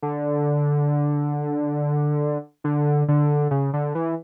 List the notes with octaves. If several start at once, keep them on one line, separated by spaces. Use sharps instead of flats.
D3
D3
D3
C#3
D3
E3